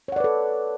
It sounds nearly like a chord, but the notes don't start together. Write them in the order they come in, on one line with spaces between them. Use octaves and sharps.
C#5 F#5 D5 B4 A4